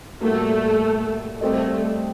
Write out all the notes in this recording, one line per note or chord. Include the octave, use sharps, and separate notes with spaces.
A2 G3 A3 A#3 F#4 A#4
G3 A3 C4 G4 A#4 D#5